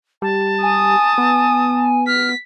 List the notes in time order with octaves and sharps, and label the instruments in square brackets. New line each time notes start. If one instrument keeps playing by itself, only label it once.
[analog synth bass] G3 [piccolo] A5
[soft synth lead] G#5 [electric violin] D#6
[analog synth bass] B3
[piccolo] F6 [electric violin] B6